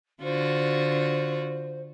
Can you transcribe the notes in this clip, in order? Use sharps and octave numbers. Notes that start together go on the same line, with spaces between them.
D3 F4 F#4 C5